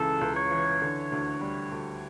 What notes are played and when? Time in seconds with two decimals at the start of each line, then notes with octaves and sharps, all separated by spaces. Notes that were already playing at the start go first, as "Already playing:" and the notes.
Already playing: C#2 C#3 E3 A4
0.21 C#2
0.36 C#5
0.51 E3
0.82 D3
1.12 D2
1.41 G3
1.72 D2